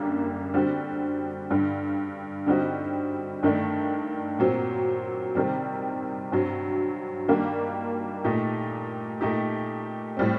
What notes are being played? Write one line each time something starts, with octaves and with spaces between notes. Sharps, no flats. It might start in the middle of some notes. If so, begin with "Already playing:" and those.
Already playing: F#2 D3 G3 A#3
D3 G3 C4 F#4
G2 D3 G3
D3 G3 C4 D#4 F#4
G2 D#3 A3 D4
A#2 F#3 C4
C3 D#3 G3 C4
G2 F#3 C4
D#3 G3 A#3 D4 F#4
A#2 A3 D#4 G4
A#2 A3 D#4 G4
A2 G3 C4